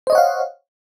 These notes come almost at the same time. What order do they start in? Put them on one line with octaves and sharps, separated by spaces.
C5 D#5 C#5 F#5 F5